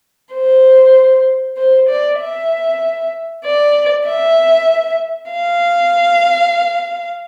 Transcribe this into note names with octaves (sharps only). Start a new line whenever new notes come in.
C5
C5
D5
E5
D5
E5
F5